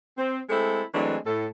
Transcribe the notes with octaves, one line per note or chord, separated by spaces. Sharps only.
C4
G#3 A3 C4 E4 A4
E3 F#3 G#3 A3 C4 D4
A2 A4